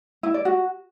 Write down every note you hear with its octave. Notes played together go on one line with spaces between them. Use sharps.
E4
D5
F#4